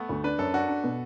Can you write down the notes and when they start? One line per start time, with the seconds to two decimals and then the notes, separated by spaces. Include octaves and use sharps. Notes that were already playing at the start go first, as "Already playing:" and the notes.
Already playing: A3 B3
0.09 D2
0.24 D4 B4
0.39 F#2 A4
0.53 D4 F#4
0.68 D4
0.84 B2